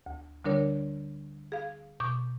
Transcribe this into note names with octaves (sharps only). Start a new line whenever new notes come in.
D2
D3 G3 D4 A#4 C#5
G#4 F5
B2 C#6 D6 G6